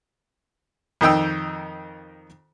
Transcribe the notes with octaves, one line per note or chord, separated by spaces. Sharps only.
F2 D#3 D#4 G5 E6